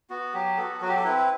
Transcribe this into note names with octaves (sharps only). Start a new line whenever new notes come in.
B3 F#4
F#3 G4
B3 F#4 A4
F#3 F#4
G4
A4
C4 E4 B4